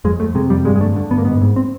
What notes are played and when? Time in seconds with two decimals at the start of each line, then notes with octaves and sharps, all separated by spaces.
0.05 F2 G#3
0.20 F2 A3
0.35 C3 G#3
0.50 F2 G3
0.65 G2 G#3
0.76 G#3
0.81 D3 A3
0.96 D3
1.11 G2 B3
1.18 A#3
1.25 G#2 B3
1.41 G#2
1.56 C4